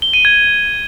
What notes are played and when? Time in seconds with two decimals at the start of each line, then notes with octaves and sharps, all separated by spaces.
0.02 G7
0.13 D#7
0.25 G#6